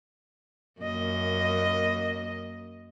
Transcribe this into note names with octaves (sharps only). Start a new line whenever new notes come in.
F#2 A#3 D#5